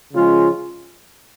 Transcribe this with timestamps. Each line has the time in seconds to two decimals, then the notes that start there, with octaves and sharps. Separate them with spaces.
0.12 C#3 F3 G#3 C#4 F4